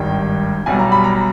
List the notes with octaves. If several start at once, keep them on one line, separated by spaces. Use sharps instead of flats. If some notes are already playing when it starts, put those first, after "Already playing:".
Already playing: G#1 G2 D#3 G5
B1 B2 G3 G#5
A#5
B5
A#5